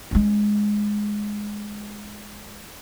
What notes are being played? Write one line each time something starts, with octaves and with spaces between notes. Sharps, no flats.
G#3 C#4